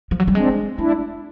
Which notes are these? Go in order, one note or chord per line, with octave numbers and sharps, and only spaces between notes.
F3
F#3
G3
G#3 C4 D4
A3 D4 E4